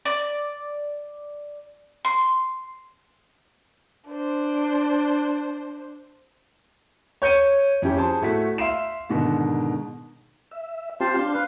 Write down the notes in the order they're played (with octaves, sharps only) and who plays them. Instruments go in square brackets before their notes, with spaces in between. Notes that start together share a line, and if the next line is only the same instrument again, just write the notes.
[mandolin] D5
C6
[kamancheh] D4 C5
[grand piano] C#5 G6 C#7 D#7
F2 C#4 E4 G4
G#4 C5 A5
A2 A3 F#4 B6
E5 F5 C6 C7 E7
G#2 B2 D3 D#3
[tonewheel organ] E5
[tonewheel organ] C4 F4 G4 [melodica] C5 A5 C6
[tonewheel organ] D4 C6 [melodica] F5
[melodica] B4 F5